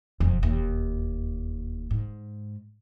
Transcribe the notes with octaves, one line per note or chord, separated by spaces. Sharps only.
E1 F2
D#2
G#2